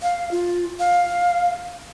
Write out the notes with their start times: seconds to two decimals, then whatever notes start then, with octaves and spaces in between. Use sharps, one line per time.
0.02 F5
0.31 F4
0.80 F5